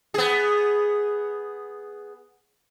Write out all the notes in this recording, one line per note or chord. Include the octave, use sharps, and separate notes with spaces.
B3 G#4